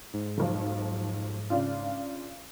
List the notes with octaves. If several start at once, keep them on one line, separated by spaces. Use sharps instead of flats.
G#2
F1 B1 F3
C#3 D4 F4